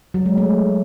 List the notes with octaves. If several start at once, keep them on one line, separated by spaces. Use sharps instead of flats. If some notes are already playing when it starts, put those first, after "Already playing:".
F#3
G#3
A3